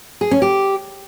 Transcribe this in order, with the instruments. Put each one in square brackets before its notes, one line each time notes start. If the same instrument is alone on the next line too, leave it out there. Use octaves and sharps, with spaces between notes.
[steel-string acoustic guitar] G#4
C#4
G4